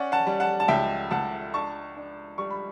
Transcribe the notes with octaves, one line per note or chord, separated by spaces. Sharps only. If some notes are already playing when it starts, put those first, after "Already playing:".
Already playing: C#4 D5 F#5
F#5 A5
G3
F#5 A5
A5
C#2 E5 G5
C#2 F#5 A5
D4 A5 C#6
D4
G3 C#6
B5